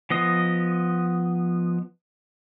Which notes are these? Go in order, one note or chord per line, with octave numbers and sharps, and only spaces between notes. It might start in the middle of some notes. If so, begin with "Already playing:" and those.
F3 B3 D#5